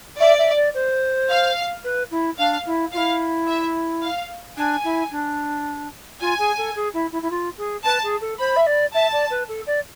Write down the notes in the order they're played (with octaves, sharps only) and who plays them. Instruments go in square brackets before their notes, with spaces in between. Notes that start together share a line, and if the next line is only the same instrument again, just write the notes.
[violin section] D5 [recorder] E5
[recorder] E5
D5
C5
[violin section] F5
[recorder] B4
E4
[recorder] D4 [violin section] F5
[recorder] E4
[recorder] F4 [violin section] F5
[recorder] E4
[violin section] E5
F5
[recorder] D4 [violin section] G#5
[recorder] E4
D4
[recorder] F4 [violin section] G#5
[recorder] G#4
A4
G#4
E4
E4
E4
F4
G#4
[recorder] B4 [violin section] A5
[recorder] G#4
A4
[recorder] C5 [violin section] B5
[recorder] E5
D5
[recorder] E5 [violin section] A5
[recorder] D5
B4
A4
D5